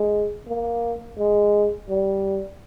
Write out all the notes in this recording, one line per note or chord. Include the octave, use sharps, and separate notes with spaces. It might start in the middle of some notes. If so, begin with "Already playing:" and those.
Already playing: G#3
A#3
G#3
G3